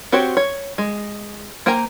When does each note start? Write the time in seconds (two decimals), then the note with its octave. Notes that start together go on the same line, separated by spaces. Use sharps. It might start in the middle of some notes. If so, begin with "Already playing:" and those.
0.12 C4 F#4 G4 C5 C#5
0.37 C#5
0.78 G#3
1.66 A#3 C5 G5 G#5 A#5